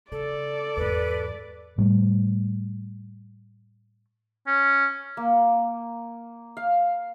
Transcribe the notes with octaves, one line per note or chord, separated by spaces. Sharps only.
C#3 A4 D5
E2 G#2 B4
A2 G3 A3
C#4
A#3
F5